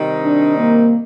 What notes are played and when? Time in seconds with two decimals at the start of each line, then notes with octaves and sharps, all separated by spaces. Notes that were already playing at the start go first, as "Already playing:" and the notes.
Already playing: C3 D#3 G3 C4 D#4
0.22 D4
0.57 A#3